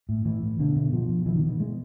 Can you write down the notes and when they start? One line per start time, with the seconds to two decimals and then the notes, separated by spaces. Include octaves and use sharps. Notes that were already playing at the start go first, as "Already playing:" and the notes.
0.09 A2
0.25 A2 E3
0.42 A2
0.59 B2 D3
0.76 B2
0.92 B2 F3
1.09 B2
1.26 B2 E3
1.36 D#3
1.43 B2 E3
1.59 B2 G#3